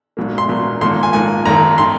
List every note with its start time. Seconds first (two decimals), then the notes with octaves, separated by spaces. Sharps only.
0.17 A#1 G#2 F#3 A#3
0.38 C6
0.49 A#1 G#2 F#3 A#3
0.81 G#1 G#2 F3 A#3 C6
1.03 G#5
1.13 G#1 G#2 F3 A#3 G#5
1.45 G#1 F#2 D#3 A#5
1.78 D#3 C6